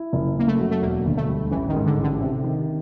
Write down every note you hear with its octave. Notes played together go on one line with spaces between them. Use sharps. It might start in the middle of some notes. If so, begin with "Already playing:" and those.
Already playing: E4
F#1
F#2 A#3
A3
F#3
A3
E1 A#3
D2
A3
G3
A1 E3
D#3
G#2
D3
A1
D3
C3
D#3